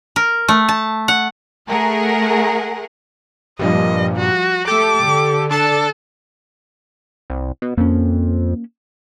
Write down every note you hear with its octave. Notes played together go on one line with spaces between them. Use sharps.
A#4
A3
A5
F#5
A3 G#4 A#4 F#5
G2 A#2 F3 G3 D#5
F#4
A3 G4 A4 D6
D3
D4 A4 A5 A6
C2
B2
F2 A#3 C#4